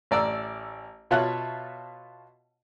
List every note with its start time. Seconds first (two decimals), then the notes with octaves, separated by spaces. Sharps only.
0.11 A1 D5 A#5 E6
1.11 B2 F4 C#5 E5 A5 F#6